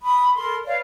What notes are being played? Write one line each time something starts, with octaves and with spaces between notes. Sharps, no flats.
B5 D#6
A4 A#4 B5 C6
B4 C#5 D5 F5